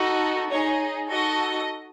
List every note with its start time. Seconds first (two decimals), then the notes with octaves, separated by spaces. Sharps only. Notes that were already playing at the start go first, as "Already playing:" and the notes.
Already playing: D#4 F#4 A4
0.50 D#4 G#4 C#5
1.09 D#4 F#4 A4 D#5